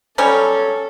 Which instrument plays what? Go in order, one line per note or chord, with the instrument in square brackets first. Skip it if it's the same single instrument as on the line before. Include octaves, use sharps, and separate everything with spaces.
[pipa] F#3 G3 C#4 [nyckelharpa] A4